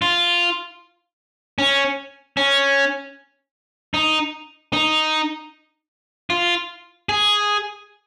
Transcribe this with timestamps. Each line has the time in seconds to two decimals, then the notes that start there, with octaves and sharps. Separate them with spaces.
0.02 F4
1.59 C#4
2.37 C#4
3.94 D#4
4.73 D#4
6.30 F4
7.09 G#4